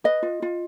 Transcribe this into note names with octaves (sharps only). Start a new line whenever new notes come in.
B4 D#5
F4
F4